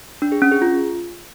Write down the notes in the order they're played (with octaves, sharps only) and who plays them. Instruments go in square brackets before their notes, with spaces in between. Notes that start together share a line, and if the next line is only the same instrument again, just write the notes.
[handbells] D4
G#4
C#4
G#4
F4